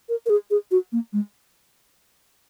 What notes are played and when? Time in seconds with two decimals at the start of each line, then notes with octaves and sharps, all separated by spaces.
0.09 A#4
0.26 A#4
0.30 G#4
0.50 G#4
0.71 F#4
0.92 A#3
1.13 G#3